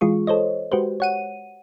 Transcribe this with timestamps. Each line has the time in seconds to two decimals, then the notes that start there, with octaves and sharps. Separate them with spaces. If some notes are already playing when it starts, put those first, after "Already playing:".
0.01 E3 G#3 F4 G#4 C#6
0.27 A4 C5 C#5 D#5
0.72 G#3 F#4 G4 B4 C5
1.00 C#5 F#5 D#7